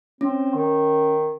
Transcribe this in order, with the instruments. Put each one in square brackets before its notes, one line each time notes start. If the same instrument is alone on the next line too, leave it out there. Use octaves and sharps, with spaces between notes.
[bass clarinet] C4 [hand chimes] C#4
[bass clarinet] D#3